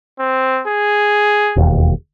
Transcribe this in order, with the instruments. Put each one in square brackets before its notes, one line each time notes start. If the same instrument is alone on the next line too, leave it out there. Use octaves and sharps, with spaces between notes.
[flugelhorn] C4
G#4
[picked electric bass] E1 D#2